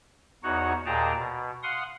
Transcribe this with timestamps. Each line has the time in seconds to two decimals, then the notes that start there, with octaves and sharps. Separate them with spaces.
0.43 E2 D#4 F#4 C#5 F#5
0.86 D#2 A#2 G#4 G5 A5 A#5
1.18 B2
1.63 F5 F#5 C6 D#6